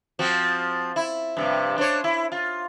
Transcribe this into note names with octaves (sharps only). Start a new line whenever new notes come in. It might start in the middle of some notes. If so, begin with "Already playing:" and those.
F3 C4 F#4
E4
G2 C3 F3
D4 C5 C#5
E4
F4